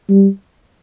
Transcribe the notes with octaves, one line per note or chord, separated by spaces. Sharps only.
G3